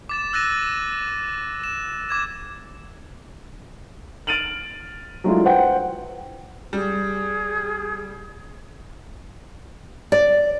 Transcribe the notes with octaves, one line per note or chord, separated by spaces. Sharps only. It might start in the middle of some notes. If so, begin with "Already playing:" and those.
D6 A6 E7
E6 F#6 A6 A#6 D#7
E7
D6 G#6 E7
F6 A6 D7 D#7 F7 F#7
F#3 G#3 A3 D4 E4 F4
B4 C5 F#5 G5
G3 G#4
D5